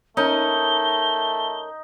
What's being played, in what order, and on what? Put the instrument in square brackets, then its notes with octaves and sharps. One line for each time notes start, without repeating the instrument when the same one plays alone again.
[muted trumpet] A3 [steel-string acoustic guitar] C#4 A#4 [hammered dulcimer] D#4 [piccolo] G7